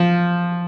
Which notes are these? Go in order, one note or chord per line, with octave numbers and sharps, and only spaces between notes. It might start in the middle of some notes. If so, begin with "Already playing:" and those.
Already playing: F3